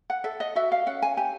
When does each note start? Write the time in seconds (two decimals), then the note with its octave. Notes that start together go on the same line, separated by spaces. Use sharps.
0.10 F#5
0.24 A4 E5
0.40 D#5
0.55 F#4 E5
0.72 F5
0.86 C#4 F#5
1.02 G#5
1.17 G4 G#5